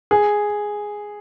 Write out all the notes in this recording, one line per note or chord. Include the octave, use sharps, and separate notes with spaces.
G#4